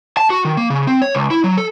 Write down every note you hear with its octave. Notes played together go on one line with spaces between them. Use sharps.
A5
F#4
D#3
A#3
C#3
C4
C#5
C#2
E4
F#3
A4